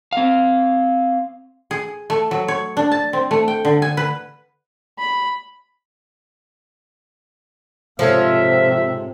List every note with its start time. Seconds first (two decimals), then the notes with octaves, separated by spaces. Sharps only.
0.13 C4 F5
1.71 G#4
2.10 A3
2.31 F#3
2.48 C#5
2.77 D4
2.92 A5
3.13 C4
3.31 A3
3.48 G5
3.65 D3
3.82 G#5
3.97 B4
4.99 B5
7.99 G#2 C3 F3 A4 C#5 E5